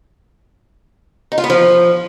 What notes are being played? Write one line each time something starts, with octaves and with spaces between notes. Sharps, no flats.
D#4
F4
B3
F3